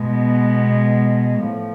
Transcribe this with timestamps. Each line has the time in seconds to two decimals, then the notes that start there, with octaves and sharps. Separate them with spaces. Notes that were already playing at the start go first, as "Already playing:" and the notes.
Already playing: B2 G#3 B3
1.43 A2 F3